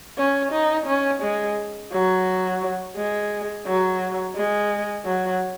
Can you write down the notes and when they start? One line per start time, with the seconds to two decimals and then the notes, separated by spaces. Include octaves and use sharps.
0.17 C#4
0.52 D#4
0.86 C#4
1.22 G#3
1.92 F#3
2.96 G#3
3.66 F#3
4.36 G#3
5.05 F#3